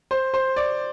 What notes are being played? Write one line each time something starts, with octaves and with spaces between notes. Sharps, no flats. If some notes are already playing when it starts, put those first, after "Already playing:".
C5
C5
D5